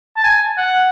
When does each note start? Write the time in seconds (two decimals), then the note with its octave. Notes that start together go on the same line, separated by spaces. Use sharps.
0.17 A5
0.24 G#5
0.58 F#5